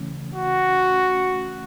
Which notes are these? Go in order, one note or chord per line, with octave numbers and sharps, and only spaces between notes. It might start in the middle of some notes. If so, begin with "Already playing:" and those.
Already playing: C#3 E3 A3 C#4
F#4